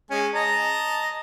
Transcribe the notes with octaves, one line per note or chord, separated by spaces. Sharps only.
G#3 C#4 G#5
D#5 A5 A#5